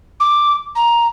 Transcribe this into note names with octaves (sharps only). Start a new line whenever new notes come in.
D6
A#5